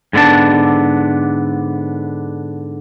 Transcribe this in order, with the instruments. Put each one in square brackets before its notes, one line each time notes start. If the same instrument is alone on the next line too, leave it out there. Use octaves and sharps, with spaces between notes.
[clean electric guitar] G#2 D3 B3 D4 A5